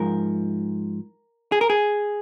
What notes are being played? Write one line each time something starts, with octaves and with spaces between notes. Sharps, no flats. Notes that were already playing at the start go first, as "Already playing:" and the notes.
Already playing: G#2 F3 A#4
G#4
A#4
G#4